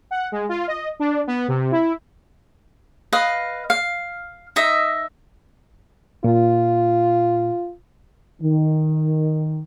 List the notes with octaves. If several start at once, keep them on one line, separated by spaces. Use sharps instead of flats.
F#5
G#3
F4
D#5
D4
B3
C3
E4
B4 D#5 F5
F5
D#4 D#5 E5
A#2 F4
D#3